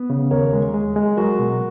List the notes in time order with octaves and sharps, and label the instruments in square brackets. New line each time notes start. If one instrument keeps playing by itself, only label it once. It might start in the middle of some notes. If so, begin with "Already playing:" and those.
Already playing: [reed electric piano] B3
C#3
[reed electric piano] D#2 [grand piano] A#4 C#5
[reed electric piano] G#3
G#3
G#3
[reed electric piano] F#3 [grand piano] F#4 A#4
[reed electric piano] B2